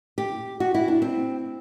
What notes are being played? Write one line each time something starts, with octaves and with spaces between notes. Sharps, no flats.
G4
F#4
E4
D4
C4